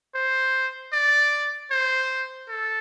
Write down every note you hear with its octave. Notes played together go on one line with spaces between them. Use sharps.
C5
D5
C5
A4